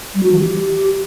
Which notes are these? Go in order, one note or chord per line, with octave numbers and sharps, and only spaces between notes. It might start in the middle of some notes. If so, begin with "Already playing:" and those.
G3
F#4
E3
G4